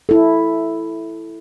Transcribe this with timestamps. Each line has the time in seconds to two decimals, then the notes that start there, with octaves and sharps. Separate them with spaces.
0.09 E4 A4